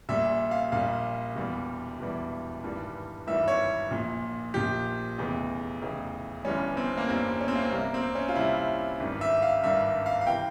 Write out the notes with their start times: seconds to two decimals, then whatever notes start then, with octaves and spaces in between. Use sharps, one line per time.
0.09 A#1 A#2 G3 E5
0.51 F5
0.72 A#1 A#2 G3 F5
1.36 E1 E2 E3 G3
2.00 E1 E2 E3 G3
2.64 G#1 G2 E3 G3
3.27 G#1 G2 E3 G3 E5
3.48 C#5
3.91 A#1 A#2 F3
4.54 A#1 A#2 F3 G4
5.18 F1 E2 C#3
5.82 F1 E2 C#3
6.45 G1 G2 E3 G3 C#4
6.77 C4
6.98 A#3
7.09 G1 G2 E3 G3 C4
7.41 C#4
7.48 C4
7.56 A#3
7.62 C4
7.72 C2 C3 G3 A#3
7.94 C4
8.15 C#4
8.29 F4
8.36 C2 C3 G3 E4
9.00 G#1 G2 G3
9.21 E5
9.42 F5
9.63 G#1 G2 G3 E5
10.06 F5
10.21 F5
10.27 C3 E3 G5